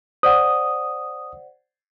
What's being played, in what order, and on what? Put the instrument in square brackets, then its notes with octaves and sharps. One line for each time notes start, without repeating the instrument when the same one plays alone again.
[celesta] C5 D5 F#5 [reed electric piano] D#6